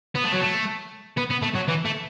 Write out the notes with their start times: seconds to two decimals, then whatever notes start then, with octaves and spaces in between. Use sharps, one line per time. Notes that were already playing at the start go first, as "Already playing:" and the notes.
0.15 B3
0.24 A3
0.32 F#3
0.41 A3
1.18 B3
1.31 B3
1.43 A3
1.56 F#3
1.69 E3
1.85 A3